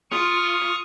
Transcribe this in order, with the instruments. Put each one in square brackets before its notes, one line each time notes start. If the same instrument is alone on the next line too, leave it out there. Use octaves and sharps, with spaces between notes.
[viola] F4 [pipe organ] C#6 D#6 F6